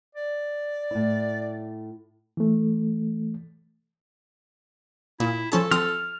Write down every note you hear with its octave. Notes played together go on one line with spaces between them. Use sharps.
D5
A2 E4
E3 A3
A#2 E4
F3 C#4 A4 A5
F3 C4 D#6 F6